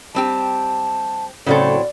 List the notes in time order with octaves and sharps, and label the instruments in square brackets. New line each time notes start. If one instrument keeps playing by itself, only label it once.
[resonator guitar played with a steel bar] G3 C4 G4 [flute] A5
[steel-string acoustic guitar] A2 F#3 C4 [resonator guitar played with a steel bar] C#3 A3 A4 [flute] D5